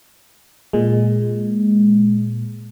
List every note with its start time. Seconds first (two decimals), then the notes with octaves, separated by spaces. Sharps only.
0.73 A#2 G#3